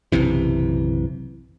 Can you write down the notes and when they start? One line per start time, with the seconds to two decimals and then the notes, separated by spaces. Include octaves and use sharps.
0.12 F#1 B1 C3 E3